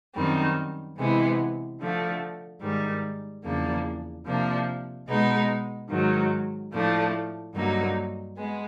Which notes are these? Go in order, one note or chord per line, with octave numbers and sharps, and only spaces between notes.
F#2 D#3 G3 C4
C3 E3 G#3 B3
D3 F3 A3
G#2 D#3 G3
E2 C#3 F3 A#3 D4
C3 F3 A#3 D4
B2 G#3 B3 D#4
G#2 D#3 F#3
A2 F3 A3 D4
G2 D3 F#3 A#3 D#4
G#3 B3